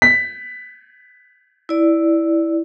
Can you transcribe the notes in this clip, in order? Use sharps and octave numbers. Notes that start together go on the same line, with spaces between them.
B6
E4 D5